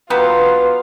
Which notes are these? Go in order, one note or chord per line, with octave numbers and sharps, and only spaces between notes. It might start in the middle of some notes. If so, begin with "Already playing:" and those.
F#3 B3 F4 G4 B4